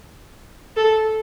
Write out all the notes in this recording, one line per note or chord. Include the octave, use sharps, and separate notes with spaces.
A4